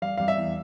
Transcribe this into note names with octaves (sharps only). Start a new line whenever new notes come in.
G3 F5
G3 F5
E5
E2